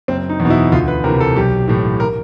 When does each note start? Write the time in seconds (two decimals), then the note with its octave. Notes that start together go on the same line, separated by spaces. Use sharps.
0.08 F#1 C4
0.29 D#4
0.40 E2
0.45 B2 D#4
0.50 E4
0.72 D2 F4
0.88 B4
1.04 C3 E3 A#4
1.20 A4
1.36 B1 G4
1.68 A2 E3
2.00 A#4